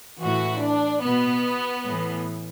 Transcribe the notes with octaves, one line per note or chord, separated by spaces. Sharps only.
A2 E3 F#4
D4
B2 B3
A2 E3